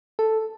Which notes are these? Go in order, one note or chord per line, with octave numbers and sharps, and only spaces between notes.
A4